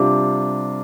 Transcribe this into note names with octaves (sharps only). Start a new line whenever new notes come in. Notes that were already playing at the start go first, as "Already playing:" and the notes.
Already playing: C3 G3 D4 F4 D6